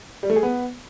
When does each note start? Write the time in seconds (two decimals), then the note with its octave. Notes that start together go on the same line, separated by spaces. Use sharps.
0.23 G3
0.30 A3
0.36 G#4
0.43 B3